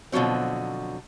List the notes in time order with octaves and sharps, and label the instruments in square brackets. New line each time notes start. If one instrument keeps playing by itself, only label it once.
[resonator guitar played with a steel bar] B2 D3 F3 F#3 C4